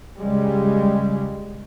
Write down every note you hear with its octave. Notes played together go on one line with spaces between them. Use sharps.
C#2 C#3 G3 G#3